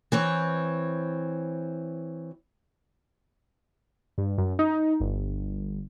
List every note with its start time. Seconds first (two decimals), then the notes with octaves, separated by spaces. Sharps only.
0.12 E3 C4 C#5
4.18 G2
4.38 F#2
4.59 D#4
5.00 G1